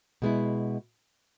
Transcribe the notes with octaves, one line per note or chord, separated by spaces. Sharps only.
B2 G#3 B3 E4